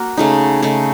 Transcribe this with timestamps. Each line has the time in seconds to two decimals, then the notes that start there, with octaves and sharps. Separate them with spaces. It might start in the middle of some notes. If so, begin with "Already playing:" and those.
Already playing: A#3 F#4
0.17 C#3 A3 D#4
0.62 C#3 A3 D#4